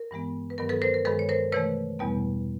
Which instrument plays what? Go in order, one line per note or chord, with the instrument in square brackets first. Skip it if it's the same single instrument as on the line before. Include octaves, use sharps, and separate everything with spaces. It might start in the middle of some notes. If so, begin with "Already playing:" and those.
Already playing: [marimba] A#4
G2 E3 G#3 B3
B4
G2 D#3 F#3 B3 A#4
A4 B4
A#4 C5
A#4
G2 D#3 G#3 A4 B4
C#5
A#4 C5
C3 E3 A3 B4 C#5
E2 B2 G3 B3